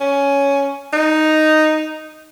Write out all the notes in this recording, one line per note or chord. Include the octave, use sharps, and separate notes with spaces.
C#4
D#4